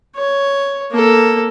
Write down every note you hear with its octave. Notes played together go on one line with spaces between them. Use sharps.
C#5
A#3 A4